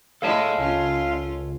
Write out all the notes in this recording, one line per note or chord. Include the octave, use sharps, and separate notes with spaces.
G#3 A3 E4 A4 C#5 F5 A5
C#2 C#4 F4